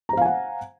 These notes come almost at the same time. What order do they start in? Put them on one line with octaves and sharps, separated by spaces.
A#5 C5 F5 G#5 F#5